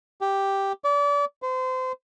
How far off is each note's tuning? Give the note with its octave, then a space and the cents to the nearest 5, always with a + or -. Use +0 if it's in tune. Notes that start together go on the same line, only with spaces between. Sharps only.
G4 +0
D5 -35
C5 -30